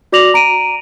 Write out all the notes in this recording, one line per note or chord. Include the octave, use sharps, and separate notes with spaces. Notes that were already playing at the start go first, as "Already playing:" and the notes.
F#4 D5 D6 A#6 F7 F#7
A#5 D7 D#7